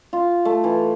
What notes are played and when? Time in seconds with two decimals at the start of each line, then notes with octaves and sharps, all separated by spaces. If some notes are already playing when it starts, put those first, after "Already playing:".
0.13 F4
0.45 A3
0.64 E3